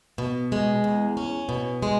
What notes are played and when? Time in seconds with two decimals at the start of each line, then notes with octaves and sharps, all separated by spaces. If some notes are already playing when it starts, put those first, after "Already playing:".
0.18 B2
0.52 G#3
0.84 E2
1.17 C#4
1.49 B2
1.83 G#3